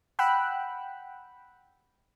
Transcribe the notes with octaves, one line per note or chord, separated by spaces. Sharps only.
F#5 G5 B5 E6 F#6